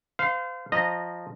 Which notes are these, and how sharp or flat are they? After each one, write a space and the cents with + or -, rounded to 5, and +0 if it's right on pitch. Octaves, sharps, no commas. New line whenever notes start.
C5 -35 F5 +0
F3 +0 D#5 -15 A#5 +0